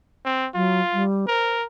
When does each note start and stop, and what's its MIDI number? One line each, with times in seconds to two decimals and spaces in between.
0.25 0.48 60
0.55 0.80 54
0.55 1.04 65
0.93 1.26 55
1.28 1.66 70
1.28 1.55 72